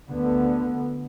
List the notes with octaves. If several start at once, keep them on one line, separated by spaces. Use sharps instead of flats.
D2 D3 B3